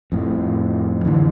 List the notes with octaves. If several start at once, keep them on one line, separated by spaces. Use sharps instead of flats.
F2 A2
F2 D3 E3